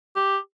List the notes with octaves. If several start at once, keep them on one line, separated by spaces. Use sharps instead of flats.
G4